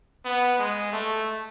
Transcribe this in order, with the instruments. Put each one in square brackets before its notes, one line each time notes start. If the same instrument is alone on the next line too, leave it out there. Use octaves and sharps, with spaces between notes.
[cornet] B3
G#3
A3